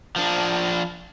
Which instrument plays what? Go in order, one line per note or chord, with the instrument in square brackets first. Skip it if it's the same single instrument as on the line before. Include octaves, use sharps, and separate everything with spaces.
[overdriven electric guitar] F3 D4